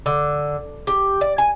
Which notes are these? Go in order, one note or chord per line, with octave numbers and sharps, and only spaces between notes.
D3
G4
D5
G#5